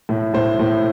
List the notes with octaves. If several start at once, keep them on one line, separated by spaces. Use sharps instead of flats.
A2
A2 C5
A2